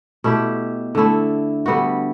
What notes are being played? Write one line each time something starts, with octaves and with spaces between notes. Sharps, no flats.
B2 A3 E4 G4
D3 A3 E4
D3 G3 B3 F#4